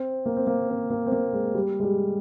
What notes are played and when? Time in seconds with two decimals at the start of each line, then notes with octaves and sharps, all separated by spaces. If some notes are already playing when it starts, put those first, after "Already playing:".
Already playing: C4
0.26 A#3
0.37 C4
0.47 A#3
0.69 C4
0.90 A#3
1.06 C4
1.12 A#3
1.33 G#3
1.54 G3
1.80 G#3
1.83 G3